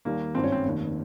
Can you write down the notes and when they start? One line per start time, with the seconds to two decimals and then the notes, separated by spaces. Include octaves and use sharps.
0.05 D#2 D#3 G3 A#3
0.35 G#1 G2 D#3 G3 C4
0.44 C#4
0.52 C4
0.65 F1 D#2 D#3